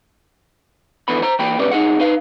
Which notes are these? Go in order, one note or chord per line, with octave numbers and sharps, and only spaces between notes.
F2 D3 E3 B3 B5
C5 A#5
E3 A#3 G5 B5
C#2 B2 G3 C#4 B4 D5
C2 D#4 G#4 F#5
D#4 B4 F5